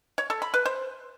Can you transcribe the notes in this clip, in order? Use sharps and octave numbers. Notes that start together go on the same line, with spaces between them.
C#5
A4
B5
B4
C5